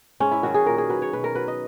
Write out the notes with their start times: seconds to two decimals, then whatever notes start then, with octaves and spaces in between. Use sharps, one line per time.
0.20 G#2 C#4
0.31 E4
0.43 D#3 F#3 F#4
0.54 G#4
0.66 A#2 A#4
0.78 G#4
0.90 F#3 B4
1.02 C#5
1.13 B2 B4
1.24 A#4
1.35 F#3 B4
1.48 D#5